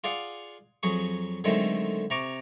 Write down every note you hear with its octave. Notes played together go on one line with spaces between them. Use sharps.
F4 G#4 D5 F5 F#5
F2 F#3 G#4 C#6
D3 D#3 F#3 G#3 A3 C4
C3 A#5 C#6 D6